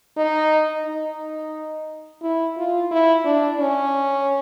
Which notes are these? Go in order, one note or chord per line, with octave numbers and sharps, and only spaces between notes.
D#4
D#4
E4
F4
E4
D4
C#4